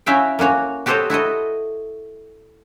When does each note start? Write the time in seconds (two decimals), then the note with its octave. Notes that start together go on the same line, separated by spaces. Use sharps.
0.06 C#4 E4 F#4 E5 F5 G5
0.39 A#3 C#4 F#4 C#5
0.86 F#4 G4 A4 C5 C#5 D#5
1.10 E4 F#4 A4 D#5